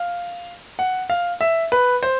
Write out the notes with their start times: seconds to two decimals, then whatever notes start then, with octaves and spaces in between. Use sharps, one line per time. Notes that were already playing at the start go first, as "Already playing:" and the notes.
Already playing: F5
0.79 F#5
1.10 F5
1.41 E5
1.72 B4
2.03 C5